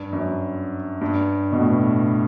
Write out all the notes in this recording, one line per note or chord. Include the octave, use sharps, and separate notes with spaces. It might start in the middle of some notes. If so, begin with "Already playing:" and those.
Already playing: G2
F#2
G2
B2
A2